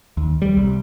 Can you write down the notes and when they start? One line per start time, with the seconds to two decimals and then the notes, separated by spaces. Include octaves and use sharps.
0.17 D#2
0.42 G3
0.57 C2